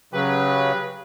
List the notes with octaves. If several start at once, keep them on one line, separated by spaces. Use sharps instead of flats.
C#3 F#3 G4 B4